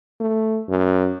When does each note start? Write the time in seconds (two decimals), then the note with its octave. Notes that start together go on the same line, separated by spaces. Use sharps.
0.20 A3
0.69 F#2